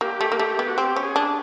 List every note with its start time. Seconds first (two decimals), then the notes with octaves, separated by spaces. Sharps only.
0.01 A#3 G4
0.21 A3
0.32 A#3
0.39 A3
0.59 B3
0.68 F#4
0.78 C4 G4
0.96 C#4
1.03 G#4
1.16 D4